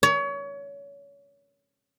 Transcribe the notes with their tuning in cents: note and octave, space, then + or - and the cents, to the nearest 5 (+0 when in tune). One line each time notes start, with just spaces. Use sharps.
C#5 +30